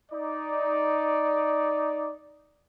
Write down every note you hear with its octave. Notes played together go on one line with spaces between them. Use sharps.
D#4 D5